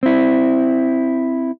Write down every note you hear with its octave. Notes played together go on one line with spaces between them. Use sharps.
C4 E4